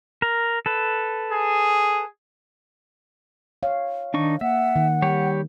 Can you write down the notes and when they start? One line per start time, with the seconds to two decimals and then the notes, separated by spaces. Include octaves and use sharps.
0.22 A#4
0.66 A4 B4
1.33 G#4
3.63 C#5 F5
4.14 D#3 D4 D#4 C#6
4.41 A#3 E5 F#5
4.76 D#3
5.02 G3 G4 C#5